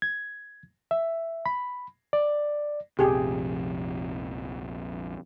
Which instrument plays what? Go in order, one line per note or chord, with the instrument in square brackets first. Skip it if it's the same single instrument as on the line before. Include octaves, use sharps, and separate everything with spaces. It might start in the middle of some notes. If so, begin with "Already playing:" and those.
[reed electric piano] G#6
E5
B5
D5
[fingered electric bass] A#1 F2 C3 [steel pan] G4 G#4